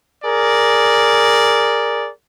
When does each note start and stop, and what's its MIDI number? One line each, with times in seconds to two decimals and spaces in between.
0.24 2.09 68
0.24 2.09 70
0.24 2.09 74